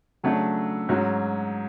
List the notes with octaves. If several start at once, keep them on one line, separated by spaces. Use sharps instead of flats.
C#3 F#3 A3 D4
G#2 F#3 C#4 F#4